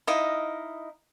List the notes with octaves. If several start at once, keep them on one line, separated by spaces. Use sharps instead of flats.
D#4 E4 D#5 F5